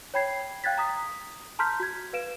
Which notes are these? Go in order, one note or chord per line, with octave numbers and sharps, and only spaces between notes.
C#5 G5 B5 G#6 C7
F5 G5 F#6 G#6 A6 B6
A#5 D#6 B6
A5 A#5 C6 F6 G6 B6
F#4 G#6
B4 F5 D7 E7